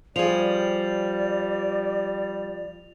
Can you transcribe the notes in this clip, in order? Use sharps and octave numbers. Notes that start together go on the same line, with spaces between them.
F3 G3 G#4 D5 F7